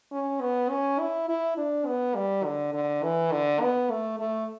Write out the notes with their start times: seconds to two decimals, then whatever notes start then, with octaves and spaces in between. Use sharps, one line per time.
0.12 C#4
0.41 B3
0.70 C#4
0.99 E4
1.29 E4
1.57 D4
1.86 B3
2.15 G3
2.45 D3
2.74 D3
3.03 E3
3.32 D3
3.61 B3
3.91 A3
4.20 A3